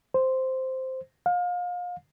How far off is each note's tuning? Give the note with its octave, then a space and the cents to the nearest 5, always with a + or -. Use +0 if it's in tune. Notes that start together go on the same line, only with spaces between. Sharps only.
C5 -5
F5 +30